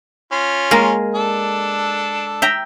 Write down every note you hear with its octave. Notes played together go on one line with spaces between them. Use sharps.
C#4 F4
G#3 A#3 A#4
D4 A4
E5 G5 A#5